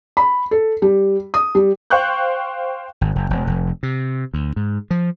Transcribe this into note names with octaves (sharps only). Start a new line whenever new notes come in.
B5
A4
G3
D#6
G3
C5 F5 G5 C#6 F#6 G6
G#1
F#1
E1
F1
C3
D2
G#2
F3